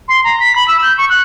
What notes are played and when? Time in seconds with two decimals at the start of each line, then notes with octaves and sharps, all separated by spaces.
0.08 C6
0.24 A#5
0.40 B6
0.56 B5
0.68 E6
0.83 G6
0.98 C#6
1.09 F#6